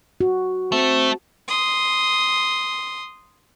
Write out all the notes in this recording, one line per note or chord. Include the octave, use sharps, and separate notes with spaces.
F#4
A3 C4
C6 D#6